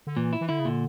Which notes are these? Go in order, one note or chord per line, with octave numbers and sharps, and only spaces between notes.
D3
A#2 E3
E4
E3
D3 E4
C#3
A#2 D3